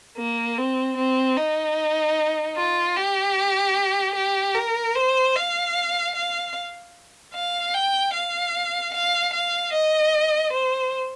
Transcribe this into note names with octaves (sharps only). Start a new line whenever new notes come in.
A#3
C4
C4
D#4
F4
G4
G4
A#4
C5
F5
F5
F5
G5
F5
F5
F5
D#5
C5